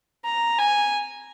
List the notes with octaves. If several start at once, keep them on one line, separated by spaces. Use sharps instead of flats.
A#5
G#5